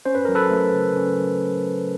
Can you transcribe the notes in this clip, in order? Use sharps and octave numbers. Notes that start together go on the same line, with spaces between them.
C#4 C5
B4
F#3 A#4
A4 B4
A3
C#3
C#4
F#3